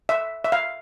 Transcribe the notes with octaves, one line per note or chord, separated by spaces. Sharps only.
E5
E5
F5